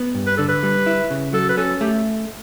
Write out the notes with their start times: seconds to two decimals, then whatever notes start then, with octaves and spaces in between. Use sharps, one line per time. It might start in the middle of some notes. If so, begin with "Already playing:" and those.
Already playing: B3
0.14 G2
0.26 B4
0.37 D3 A4
0.49 B4
0.63 G3
0.86 E4
1.10 C#3
1.33 F#3 A4
1.49 B4
1.57 C#4 A4
1.81 A3 G4